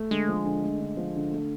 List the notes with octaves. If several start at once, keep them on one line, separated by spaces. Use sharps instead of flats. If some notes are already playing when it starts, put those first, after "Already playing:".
Already playing: A3
D3 G#3
F3
D3
A3
D3
F3
D3
A3